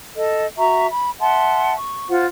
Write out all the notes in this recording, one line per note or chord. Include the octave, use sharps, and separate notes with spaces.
A4 D#5
F#4 E5 A#5 C#6
B5
E5 F#5 A5 C6
C#6
F4 C5 F#5